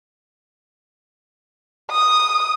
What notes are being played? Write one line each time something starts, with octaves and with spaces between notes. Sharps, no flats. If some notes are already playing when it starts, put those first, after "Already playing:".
D#6